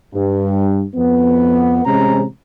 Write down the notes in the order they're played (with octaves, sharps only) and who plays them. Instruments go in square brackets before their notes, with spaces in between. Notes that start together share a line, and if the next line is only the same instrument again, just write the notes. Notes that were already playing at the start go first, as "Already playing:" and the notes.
[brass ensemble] G2
F2 B3
A1 C3 G#3 C#4 C5 A#5